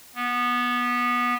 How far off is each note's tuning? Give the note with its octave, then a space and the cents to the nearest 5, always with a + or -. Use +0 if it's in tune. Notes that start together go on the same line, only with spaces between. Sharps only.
B3 -15